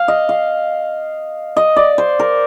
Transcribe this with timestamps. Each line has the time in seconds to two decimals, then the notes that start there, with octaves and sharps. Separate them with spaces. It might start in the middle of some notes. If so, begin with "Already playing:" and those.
Already playing: F5
0.08 D#5
0.29 F5
1.57 D#5
1.76 D5
1.98 C5
2.19 A#4